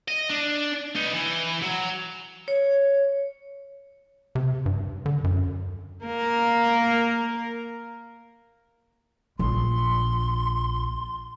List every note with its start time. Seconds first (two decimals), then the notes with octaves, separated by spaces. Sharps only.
0.08 D#5
0.30 D4
0.96 B3 D#4
1.14 E3
1.62 F#3
2.48 C#5
4.35 C3
4.66 G2
5.06 D3
5.24 F#2
6.05 A#3 A#4
9.39 A#1 C6